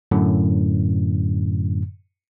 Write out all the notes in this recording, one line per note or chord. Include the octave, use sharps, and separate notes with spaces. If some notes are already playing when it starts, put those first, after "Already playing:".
F#2 A2 D3